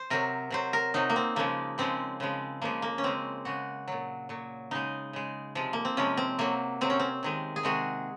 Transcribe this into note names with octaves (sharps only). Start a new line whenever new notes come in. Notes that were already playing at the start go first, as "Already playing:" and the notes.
Already playing: C5
C3 F#3 A#4
C3 F#3 C5
A#4
C3 F#3 D#4
A#3
C4
C#3 F3 G#3 A#3
C#3 F3 G#3 C4
C#3 F3 G#3
C#3 F3 G#3 A#3
A#3
C#4
C#3 G#3 C4
C#3 G#3 F#4
A#2 F#3
A#2 F#3
C#3 G#3 D#4
C#3 G#3
C3 F3 G#3
A#3
C4
C3 F3 G#3 C#4
C4
C3 F#3 A#3
C3 F#3 C4
C#4
C4
C3 D#3 G#3
G#4
C3 D#3 G#3 F#4